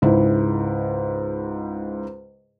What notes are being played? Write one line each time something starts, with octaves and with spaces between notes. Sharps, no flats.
C#2 G#2 E4